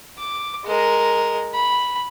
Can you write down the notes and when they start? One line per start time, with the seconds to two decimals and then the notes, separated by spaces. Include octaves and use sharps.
0.18 D6
0.65 G#3 A#4
1.54 B5